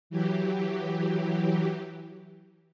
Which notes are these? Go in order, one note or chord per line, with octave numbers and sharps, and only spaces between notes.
E3 F#3 G4